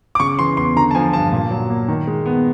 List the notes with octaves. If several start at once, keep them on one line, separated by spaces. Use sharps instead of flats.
D6
C#3 C#6
E3 C6
E2 C6
D3 A#5
A5
F3 G#5
G2 A5
A#2
F#3
A#3
D#3
G#3
B3